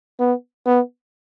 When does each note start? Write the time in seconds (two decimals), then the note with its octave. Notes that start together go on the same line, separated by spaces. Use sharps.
0.19 B3
0.66 B3